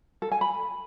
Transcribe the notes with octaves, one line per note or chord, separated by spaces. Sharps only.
A4
G#5
B5